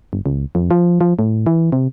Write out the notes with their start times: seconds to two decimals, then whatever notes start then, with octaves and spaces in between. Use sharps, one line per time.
0.13 G1
0.26 C#2
0.55 F2
0.71 F3
1.01 F3
1.19 A2
1.46 E3
1.72 C3